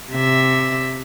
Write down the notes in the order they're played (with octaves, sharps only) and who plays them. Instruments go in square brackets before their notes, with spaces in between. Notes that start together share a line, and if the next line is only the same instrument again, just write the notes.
[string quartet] C3 E5